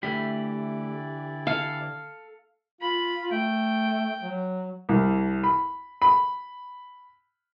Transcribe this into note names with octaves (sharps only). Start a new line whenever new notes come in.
D3 E3 A3 E4 G4 D5 B5
A4 F5
F4 B5
A3 G5
F#3
C2
B5
B5